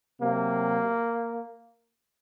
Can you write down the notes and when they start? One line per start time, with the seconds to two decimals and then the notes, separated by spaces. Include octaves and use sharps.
0.21 C3 F#3 A#3